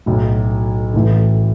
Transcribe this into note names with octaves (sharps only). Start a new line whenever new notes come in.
B1 A2 F#3
A1 A2 E3 A3 E4